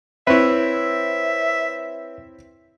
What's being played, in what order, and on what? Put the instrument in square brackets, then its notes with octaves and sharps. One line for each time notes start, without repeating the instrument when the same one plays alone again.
[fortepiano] C4 E4 [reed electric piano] B4 C#5 [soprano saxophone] E5